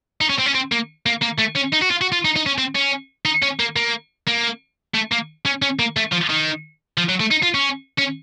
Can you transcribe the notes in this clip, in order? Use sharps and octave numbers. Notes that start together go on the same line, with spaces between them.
D#4
C#4
C4
C#4
C4
A#3
A#3
A#3
A3
C#4
D#4
F#4
F4
F#4
F4
D#4
D#4
C#4
C4
C#4
D#4
C#4
A#3
A#3
A#3
A3
A#3
C#4
C#4
A#3
A3
F3
D#3
F3
F#3
A3
D#4
F4
C#4
C#4